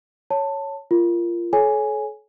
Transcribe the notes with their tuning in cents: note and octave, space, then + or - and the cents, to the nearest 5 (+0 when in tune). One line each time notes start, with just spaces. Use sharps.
C#5 +0 A5 +15
F4 -20 A#4 +0
A4 -40 C#5 +0 G#5 +0